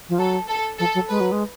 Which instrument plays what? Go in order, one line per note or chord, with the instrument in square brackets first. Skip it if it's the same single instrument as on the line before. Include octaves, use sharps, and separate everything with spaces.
[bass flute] F3
[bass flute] F#3 [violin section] A4
[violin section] A4
[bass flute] F3 [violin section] A4
[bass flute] F#3
[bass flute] G#3 [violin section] B4
[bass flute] F#3
G#3